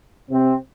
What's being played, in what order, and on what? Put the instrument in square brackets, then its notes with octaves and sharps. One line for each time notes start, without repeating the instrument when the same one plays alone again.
[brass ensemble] C3 C4